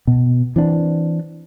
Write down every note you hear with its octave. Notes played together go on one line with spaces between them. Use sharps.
B2
E3 C4 D4